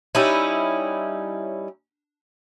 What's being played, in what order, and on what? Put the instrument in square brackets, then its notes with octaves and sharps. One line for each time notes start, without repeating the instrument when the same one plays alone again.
[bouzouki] G3 C#4 D#4 E4